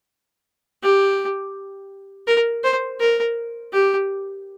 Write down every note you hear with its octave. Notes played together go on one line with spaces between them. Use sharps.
G4
A#4
C5
A#4
G4